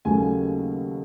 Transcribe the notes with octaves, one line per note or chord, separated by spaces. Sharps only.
D#2 C#3 F#3 A3 G#5